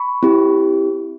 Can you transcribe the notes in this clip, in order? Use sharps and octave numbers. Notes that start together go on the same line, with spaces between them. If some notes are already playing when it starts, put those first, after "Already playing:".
Already playing: B5 C#6
C4 E4 G4